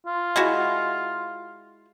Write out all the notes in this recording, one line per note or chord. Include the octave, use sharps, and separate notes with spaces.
F4
G#3 E4 F#4